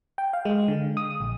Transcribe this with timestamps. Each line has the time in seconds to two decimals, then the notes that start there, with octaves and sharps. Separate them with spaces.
0.18 G5
0.33 F5
0.45 G#3
0.68 D3
0.97 D#6
1.20 A#1